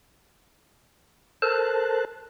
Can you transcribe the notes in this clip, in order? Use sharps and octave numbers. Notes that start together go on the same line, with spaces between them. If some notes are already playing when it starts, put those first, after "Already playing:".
A4 A#4 C5 A5 F#6